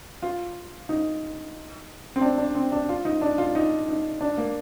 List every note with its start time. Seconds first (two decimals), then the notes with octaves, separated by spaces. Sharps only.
0.22 F4
0.89 D#4
2.16 C4
2.21 D4
2.38 D4
2.55 C4
2.72 D4
2.89 F4
3.05 D#4
3.22 D4
3.38 F4
3.55 D#4
3.88 D#4
4.21 D4
4.38 A#3